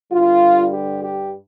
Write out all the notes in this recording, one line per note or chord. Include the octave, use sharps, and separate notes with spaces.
G2 D3 G3 F4
G4
G4